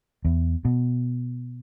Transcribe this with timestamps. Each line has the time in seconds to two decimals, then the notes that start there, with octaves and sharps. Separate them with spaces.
0.25 E2
0.65 B2